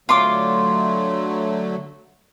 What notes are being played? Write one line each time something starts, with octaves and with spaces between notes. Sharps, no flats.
D3 F#3 A3 F4 C6 D6